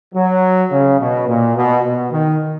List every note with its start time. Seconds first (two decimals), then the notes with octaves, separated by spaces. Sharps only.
0.14 F#3
0.71 C#3
1.00 B2
1.28 A#2
1.56 B2
1.84 B2
2.12 D#3